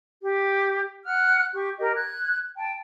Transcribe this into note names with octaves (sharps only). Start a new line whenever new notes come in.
G4
F#5 F6 F#6
G4 C#6
G4 A#4 D#5
F#6 G#6
G5 A5